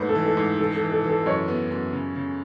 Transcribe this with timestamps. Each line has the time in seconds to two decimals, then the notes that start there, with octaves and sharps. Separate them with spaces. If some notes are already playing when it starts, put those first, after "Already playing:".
Already playing: G#2 A3 B4 C#5
0.09 A4
0.15 E3
0.26 A4
0.37 G#2
0.59 E3 A4
0.75 A4
0.82 E3
0.92 A4
1.04 E3
1.09 A4
1.26 F#2 C#5
1.48 B3
1.71 F#2
1.93 C#3
2.16 C#3